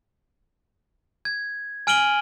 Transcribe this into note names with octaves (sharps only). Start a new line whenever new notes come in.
G#6
G#5 F6 D7 D#7 F#7 G7